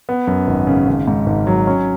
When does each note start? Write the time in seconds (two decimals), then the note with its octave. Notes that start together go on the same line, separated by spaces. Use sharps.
0.09 B3
0.27 F#2
0.47 G#1
0.67 C#3
0.87 G#1
1.08 G#2
1.26 G#1
1.47 F#3
1.67 C#4